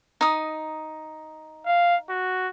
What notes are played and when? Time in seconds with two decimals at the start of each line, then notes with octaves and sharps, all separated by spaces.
0.21 D#4 D#6
1.66 F5
2.09 F#4